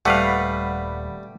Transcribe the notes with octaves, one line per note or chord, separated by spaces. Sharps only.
D#1 G3 A3 B4 F5 F#5 B5